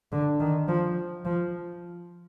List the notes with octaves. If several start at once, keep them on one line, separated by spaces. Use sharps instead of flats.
D3
D#3
F3
F3